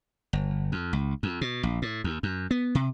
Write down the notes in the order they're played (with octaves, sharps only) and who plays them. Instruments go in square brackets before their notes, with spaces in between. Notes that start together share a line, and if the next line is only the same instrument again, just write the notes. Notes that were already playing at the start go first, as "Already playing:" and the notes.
[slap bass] G1
F2
C#2
F2
B2
A#1
A2
D#2
F#2
B3
C3